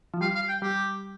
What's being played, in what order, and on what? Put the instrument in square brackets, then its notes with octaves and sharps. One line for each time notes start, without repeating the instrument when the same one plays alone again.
[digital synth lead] F3
[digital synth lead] G3 [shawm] F5
[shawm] F5
G5
[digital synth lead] G3 [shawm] G4